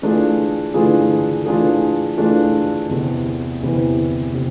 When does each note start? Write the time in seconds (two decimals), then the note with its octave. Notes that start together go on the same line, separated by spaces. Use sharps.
0.02 E3 A3 D4 F4 G#4
0.74 E3 A3 D4 F4 G#4
1.45 E3 A3 D4 F4 G#4
2.18 E3 A3 D4 F4 G#4
2.89 E2 C3 E3
3.61 E2 C3 E3
4.34 C3